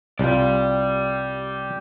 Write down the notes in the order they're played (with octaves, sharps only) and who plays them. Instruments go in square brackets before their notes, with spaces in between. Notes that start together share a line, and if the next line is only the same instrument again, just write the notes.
[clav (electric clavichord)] C2 F4 [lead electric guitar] G4 D5